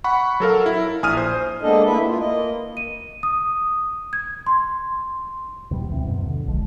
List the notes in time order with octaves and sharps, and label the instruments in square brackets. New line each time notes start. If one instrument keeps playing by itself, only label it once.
[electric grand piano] F#5 B5 C#6
F#3 A4 A#4 F5
E4
A#1 G#5 D#6 F6 D#7
C5 D#6
[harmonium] G#3 A#3 B3 D4 A4 D#5
A3 A#3 E4 B4 E5
A#3 F4
A#3 D#5
[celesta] D#7
D#6
G#6
C6
[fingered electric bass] D#2 B2 F3 G3
D2 E3 C4
F#2 B2 F#3
D3
D1 A#1 F3 G#3